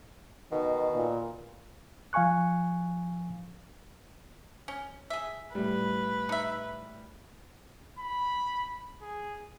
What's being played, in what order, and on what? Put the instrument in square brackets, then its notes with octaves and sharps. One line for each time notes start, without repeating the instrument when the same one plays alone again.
[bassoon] B2 [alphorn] D#3
[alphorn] A#2
[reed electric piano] F3 F5 G#5 C#6 F#6
[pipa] C#4
G#4 E5
[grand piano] A2 G3 [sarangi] B4
[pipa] D#4 E5
[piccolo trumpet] B5
G#4